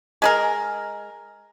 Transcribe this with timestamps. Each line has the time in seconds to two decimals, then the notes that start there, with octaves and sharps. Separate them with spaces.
0.22 G#3 G#4 A#4